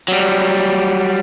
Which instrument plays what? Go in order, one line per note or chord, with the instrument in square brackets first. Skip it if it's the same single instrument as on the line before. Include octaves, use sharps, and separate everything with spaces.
[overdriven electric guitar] F#3 G3